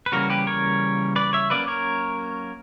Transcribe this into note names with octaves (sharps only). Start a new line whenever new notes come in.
B4
C#3 E3 G3 A#3 C#4 F#4 A#4
G4 B4
A#4 C#5
B4 D5
C#5 E5
F#3 A#3 C#4 B4 D5
A#4 C#5